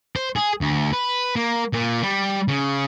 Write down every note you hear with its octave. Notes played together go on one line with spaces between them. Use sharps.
C5
G#4
D2
B4
A#3
A#2
G3
C#3